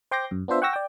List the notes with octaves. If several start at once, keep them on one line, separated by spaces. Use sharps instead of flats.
C5 G5 C6 D6 G6 A#6
F#2
B3 D4 F4 C5 E5
F#5 G5 C#6 E6 A#6
D5 G5